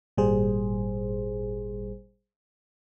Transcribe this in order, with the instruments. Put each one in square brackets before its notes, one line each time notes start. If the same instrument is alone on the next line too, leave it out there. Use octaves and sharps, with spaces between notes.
[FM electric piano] G#1 A#2 G3 G#4 C5